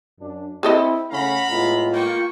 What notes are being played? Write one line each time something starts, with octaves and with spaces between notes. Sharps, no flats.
F#2 D4
C4 E4 G#4 A4 D#5
C#3 A3 C#4 F5 F#5 A#5 B5
A2 G#3 B3 F4
A#3 G5 C#6